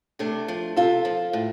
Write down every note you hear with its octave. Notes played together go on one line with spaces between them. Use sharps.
C3 A3 D4
F3
C3 F4 A4
F3
A2